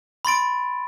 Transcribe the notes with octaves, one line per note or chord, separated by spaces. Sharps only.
B5 C6 A6 D7